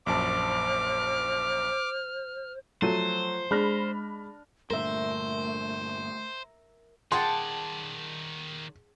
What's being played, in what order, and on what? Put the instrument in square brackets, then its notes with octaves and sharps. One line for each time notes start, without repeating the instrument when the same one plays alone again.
[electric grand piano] A#1 F#2 A5 [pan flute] C5 [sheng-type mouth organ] D6 [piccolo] F6
[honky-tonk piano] F3 D#7 [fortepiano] F#3 A3 [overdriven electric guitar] C5
[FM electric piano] G#3 [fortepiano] D4 [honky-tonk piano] B5 F6 A#6
[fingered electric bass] G2 A#2 D3 [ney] A3 [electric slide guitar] A#4 E5 [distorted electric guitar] C5
[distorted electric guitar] D#3 D5 [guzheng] G#4 F#5 G5 [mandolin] A5 [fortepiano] C6